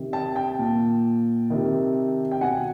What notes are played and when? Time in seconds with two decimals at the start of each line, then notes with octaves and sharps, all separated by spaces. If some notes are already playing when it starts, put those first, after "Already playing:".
Already playing: C3 D#3
0.13 G5 A5
0.36 G5 A5
0.59 A#2
1.50 C3 D#3
2.32 G5
2.41 B2 F#5 G#5